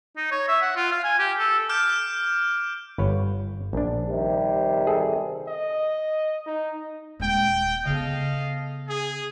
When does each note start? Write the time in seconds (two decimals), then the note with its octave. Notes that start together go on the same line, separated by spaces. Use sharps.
0.17 D#4
0.31 C#5
0.48 E5
0.62 F#5
0.76 F4
0.92 F5
1.04 G#5
1.19 G4
1.39 A4
1.69 D6 F6 G6 D7
2.98 G1 B4 C#5
3.73 A#1 D4
4.09 C3 D#3 G3
4.87 G#4 A4
5.48 D#5
6.46 D#4
7.20 D#1 G#3 G5
7.85 C#3 B3 A4 D#5 F5
8.88 G#4